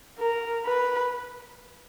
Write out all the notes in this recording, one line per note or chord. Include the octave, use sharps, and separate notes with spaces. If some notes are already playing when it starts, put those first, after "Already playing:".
A#4
B4